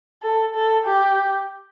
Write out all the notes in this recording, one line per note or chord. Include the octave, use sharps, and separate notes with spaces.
A4
A4
G4